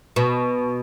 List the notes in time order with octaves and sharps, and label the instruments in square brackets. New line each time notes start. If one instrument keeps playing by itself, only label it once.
[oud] B2